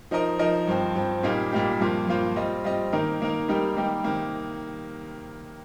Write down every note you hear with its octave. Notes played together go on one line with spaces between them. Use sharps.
F3 D#4 A#4 D#5
F3 D#4 A#4 D#5
G2 F3 C4
G2 F3 C4
A#2 G3 A#3 D#4 G4
A#2 G3 A#3 D#4 G4
G2 F3 A#3 F4 C5
G2 F3 A#3 F4 C5
G3 C4 F4 D#5
G3 C4 F4 D#5
D#3 A#3 D#4 A#4
D#3 A#3 D#4 A#4
G3 A#3 D#4 G4 A#4
G3 A#3 D#4 G4 A#4
C3 D#3 A#3